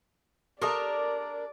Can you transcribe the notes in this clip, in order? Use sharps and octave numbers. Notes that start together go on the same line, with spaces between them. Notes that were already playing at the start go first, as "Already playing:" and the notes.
D4 G4 A4 A#4 D5 A5